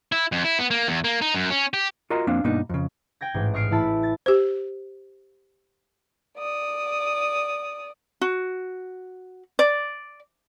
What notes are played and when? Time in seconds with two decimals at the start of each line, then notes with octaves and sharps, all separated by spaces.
0.12 E4
0.32 F2
0.44 E4
0.59 B3
0.71 A#3
0.87 E2
1.04 A#3
1.21 D#4
1.34 F#2
1.50 C#4
1.74 G4
2.10 F4 F#4 A#4 D#5 A#5
2.27 F2 A#3 C4 D4 F5
2.44 G2 B2 A#3 D4 D#4
2.69 F2 C#3
3.21 G5 G#6 A#6
3.34 A1 G#2
3.54 D#5 C#6 F6 C7 D7
3.71 A1 E4 A5 B5
4.03 A6
4.26 G4 C5
6.37 D5 D#6
8.21 F#4
9.59 D5